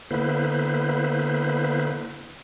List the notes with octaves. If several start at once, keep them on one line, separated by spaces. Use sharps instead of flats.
D3 A#3 B3 E4 B4 C5